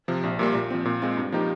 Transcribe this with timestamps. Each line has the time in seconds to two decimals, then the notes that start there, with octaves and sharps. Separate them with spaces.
0.08 C3 F3
0.23 A#1
0.39 A#2 G3 A#3
0.55 A#2
0.70 F3 C4
0.85 A#2
1.02 G#3 C4 F4
1.17 G2
1.32 F3 A#3 D#4 G4